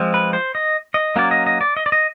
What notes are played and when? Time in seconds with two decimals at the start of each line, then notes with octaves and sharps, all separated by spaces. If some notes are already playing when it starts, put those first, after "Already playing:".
Already playing: F3 G#3 C4
0.14 B4
0.33 C5
0.55 D#5
0.94 D#5
1.16 F#3 A#3 C#4 D5
1.31 D#5
1.46 D#5
1.61 D5
1.77 D#5
1.86 D5
1.92 D#5